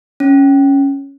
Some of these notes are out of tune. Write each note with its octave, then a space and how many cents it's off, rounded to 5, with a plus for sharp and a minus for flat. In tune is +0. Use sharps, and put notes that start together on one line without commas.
C#4 +0